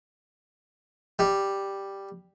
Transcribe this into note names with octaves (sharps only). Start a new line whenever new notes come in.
G3